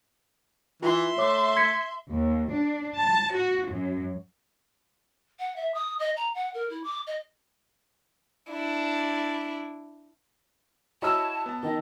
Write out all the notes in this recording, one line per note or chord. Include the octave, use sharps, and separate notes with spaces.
E3 F4 E5 C6
A3 C#5 D6
G#6 B6 C#7
D#2
D4
A5
F#4
F#2
F#5
E5
D#6
D#5
A#5
F#5
A#4
E4
D6
D#5
D4 E4
E4 F#4 C#5 D#5 A5 B5 E6
B3 A5
D#3 D#5